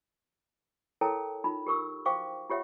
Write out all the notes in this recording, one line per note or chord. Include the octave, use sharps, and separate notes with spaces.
E4 A4 A#4 C#5 G5 A5
D#4 F4 B5
G4 A#4 C#6 E6
F#4 C5 F5 G5 C#6 D6
F4 G4 C#5 E5 F#5